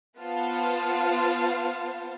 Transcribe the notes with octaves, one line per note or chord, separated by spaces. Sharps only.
B3 F4 C5 F5 A5